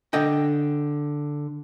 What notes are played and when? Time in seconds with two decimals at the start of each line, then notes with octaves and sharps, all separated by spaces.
0.13 D3 D#5 G5